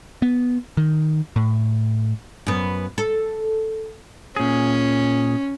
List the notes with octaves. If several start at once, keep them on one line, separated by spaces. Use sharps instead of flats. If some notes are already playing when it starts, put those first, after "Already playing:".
B3
D#3
A2
F#2 B3
A4
A#2 C#4 G#4